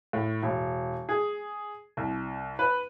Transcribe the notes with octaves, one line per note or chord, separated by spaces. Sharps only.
A2
E1
G#4
C2
B4